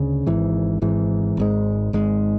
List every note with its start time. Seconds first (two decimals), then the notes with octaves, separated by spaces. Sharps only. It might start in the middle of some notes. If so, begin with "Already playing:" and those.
Already playing: D2 C#3
0.26 G#1 G#2 E3
0.81 G#1 G#2 E3
1.37 G#1 G#2 G#3
1.93 G#1 G#2 G#3